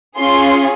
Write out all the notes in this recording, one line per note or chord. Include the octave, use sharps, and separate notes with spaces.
C#4 F4 G#4 C6